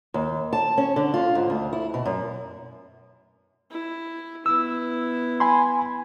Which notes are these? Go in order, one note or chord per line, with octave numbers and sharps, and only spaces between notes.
D#2
A5
C#4
D3
F4
G#2
D2
E4
B2
F#2
E4
B3 E4 E6
G#5 B5 C6